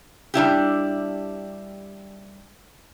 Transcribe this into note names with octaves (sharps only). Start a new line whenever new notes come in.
G3 D4 E4 G4